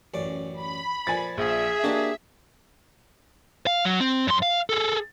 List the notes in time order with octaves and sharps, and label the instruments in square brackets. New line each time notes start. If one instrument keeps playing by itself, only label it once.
[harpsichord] A1 F#2 D5
[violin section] B5
[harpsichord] A#2 F3 [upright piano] G#5 A6
[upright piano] A#1 [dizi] G#4 [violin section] E5
[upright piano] A#3 D4 [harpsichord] F#4 G4 D#5
[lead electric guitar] F5
F#3
C4
F#2 C6
F5
G#4 A4